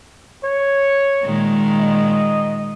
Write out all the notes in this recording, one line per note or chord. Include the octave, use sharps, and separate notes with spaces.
C#5
A#2 D#3 G#3
D#5